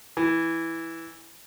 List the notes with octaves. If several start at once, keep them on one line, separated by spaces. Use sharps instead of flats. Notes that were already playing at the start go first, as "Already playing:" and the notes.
E3